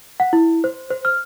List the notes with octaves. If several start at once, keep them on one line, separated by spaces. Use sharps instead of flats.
F#5
E4
C5
C5
F6